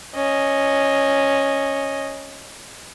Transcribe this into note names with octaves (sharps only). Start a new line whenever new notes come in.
C#4 D#5